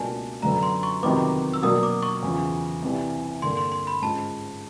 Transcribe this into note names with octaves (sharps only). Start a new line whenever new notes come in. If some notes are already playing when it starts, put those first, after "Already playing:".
Already playing: C#2 B2 G3 A#3 D4 G#5 A5
F#2 D3 F#3 B3 A#5
C6
C#6
F2 C3 D#3 F#3 B3 D6
E6
B2 F#3 A#3 D4 D#6
D6
C#6
E2 C#3 F3
C2 C3 E3 G3
G2 D3 G3 A#3 C6
C6
C6
B5
G#2 F3 G#3 C#4 A5